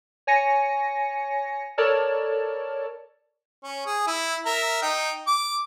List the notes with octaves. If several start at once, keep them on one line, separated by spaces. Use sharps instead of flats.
C#5 G#5 A#6 C#7
A4 A#4 C#5 D5 A5
C#4
G#4
E4
A#4 E5
D#4 G5
D6